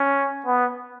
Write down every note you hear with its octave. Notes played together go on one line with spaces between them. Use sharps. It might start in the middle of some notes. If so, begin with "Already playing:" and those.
Already playing: C#4
B3